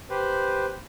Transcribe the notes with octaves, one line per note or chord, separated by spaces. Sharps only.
G4 B4 C5